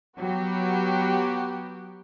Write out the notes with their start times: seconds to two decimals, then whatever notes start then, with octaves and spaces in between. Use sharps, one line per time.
0.17 F#3 B3 F#4 G4